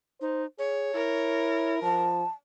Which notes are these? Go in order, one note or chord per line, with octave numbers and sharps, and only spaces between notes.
D#4 C5
G#4 C#5
E4 A#4
F3 A5